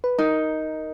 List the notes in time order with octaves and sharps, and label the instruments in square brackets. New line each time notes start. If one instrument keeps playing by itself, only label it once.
[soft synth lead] B4
[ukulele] D#4 [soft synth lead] A#4